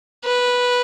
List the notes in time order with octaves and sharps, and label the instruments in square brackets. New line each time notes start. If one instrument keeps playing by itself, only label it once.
[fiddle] B4